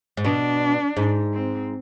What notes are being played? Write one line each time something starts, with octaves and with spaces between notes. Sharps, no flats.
G#2
B2 D4
G#2
C4